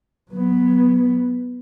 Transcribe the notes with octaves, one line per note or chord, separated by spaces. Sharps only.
F#3 B3